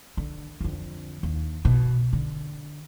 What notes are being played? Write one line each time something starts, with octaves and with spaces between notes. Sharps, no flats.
D3
F2 D3
D#2
B2
D3